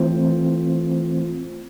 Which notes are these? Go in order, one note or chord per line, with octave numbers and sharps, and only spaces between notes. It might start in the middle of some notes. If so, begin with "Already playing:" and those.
Already playing: E3 A3 C4 F4 C5